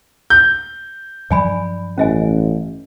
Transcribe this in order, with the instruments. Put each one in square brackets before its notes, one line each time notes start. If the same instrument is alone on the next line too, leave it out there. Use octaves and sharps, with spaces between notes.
[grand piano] G6
[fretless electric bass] G2 F3 F#3 [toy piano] D5 G#5 B5
[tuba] A1 [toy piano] C#4 D#5 G#5